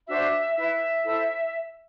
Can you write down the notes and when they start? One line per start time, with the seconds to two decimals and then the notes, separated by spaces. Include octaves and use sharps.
0.08 D4 F#4 C5 E5
0.55 E4 B4 E5
1.03 E4 A4 C5